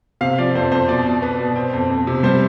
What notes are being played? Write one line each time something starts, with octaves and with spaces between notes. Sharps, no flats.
C3 F5
F3 D5
F2 C5
F2 C5
B2 D5
B2
B3
B2
C4
F2
F2
C3
G3 C5